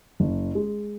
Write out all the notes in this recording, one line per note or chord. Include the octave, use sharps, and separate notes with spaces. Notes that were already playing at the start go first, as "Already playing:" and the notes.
F#1
G#3